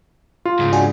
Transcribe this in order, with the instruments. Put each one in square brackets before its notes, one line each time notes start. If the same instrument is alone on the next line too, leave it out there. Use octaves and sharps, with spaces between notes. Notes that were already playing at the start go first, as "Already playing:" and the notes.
[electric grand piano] F4
[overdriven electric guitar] G#2 C#3
[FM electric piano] D4 F#4 G#4